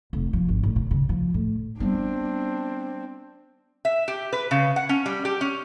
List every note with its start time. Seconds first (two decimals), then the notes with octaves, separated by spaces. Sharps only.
0.13 F1
0.33 F3
0.49 G#1
0.63 A1
0.76 B2
0.91 C#3
1.09 F3
1.34 A2
1.80 G3 B3 C4 D4
3.85 E5
4.08 G4
4.33 B4
4.51 C#3
4.76 F#5
4.89 C#4
5.06 G3
5.25 G4
5.41 C#4